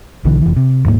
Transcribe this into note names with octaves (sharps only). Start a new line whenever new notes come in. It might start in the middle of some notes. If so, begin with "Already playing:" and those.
B1 D3 E3
F1 E3
C3
D#1 G#2 A3 A#3